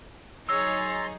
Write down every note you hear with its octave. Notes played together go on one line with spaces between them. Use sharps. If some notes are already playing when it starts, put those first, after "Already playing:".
F#3 D#4 G#4 C#5 A#5 C6 E6 A6